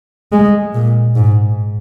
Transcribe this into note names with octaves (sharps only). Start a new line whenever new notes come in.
G#3
A#2
G#2